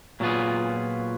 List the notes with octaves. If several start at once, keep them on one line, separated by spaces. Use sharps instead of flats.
A#2 F#3 B3 F4 G#4